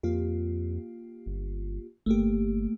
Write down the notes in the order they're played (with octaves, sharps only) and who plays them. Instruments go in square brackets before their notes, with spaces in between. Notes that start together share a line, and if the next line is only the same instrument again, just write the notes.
[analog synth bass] F2 [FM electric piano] A#3 F4 G4
[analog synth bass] G1
[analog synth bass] G1 [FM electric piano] A3 A#3 G4